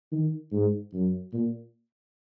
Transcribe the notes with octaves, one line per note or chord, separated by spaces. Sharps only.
D#3
G#2
F#2
A#2